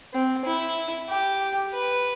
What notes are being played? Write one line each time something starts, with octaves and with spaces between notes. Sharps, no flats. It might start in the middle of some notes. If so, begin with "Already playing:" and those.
C4
E4
G4
B4